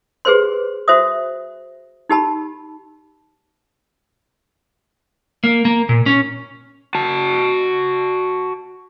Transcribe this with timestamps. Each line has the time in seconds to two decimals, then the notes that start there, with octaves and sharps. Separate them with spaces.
0.25 G4 G#4 B4 C5 C6
0.88 F#4 C5 E5 D#6
2.10 D#4 G4 A5 B5
5.44 A#3
5.65 A#3
5.89 A#2
6.06 C#4
6.95 F#4 A5